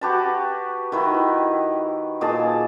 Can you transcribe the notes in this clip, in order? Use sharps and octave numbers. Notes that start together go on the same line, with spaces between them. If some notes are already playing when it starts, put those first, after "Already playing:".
F#4 G4 B4 A5
D#3 E4 B4
A#2 G#4 D#5 A5